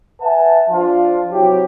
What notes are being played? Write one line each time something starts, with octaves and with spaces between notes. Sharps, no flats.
B4 E5 F#5 G#5 A5
F3 D4 F4
C3 F#3 E4 G4